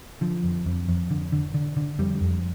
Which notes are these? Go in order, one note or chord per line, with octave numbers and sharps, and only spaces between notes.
D3 F3
F2
F2
F2
D3
D3
D3
D3
F2 G3
F2